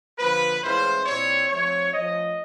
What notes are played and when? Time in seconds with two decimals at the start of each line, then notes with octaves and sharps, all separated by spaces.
0.19 D3 F3 A#3 B4
0.62 A2 E3 G#3 C#4 F4 C5
1.06 A#2 G3 C4 E4 C#5
1.49 F3 A3 C4 C#5
1.93 F3 A3 C#4 D#5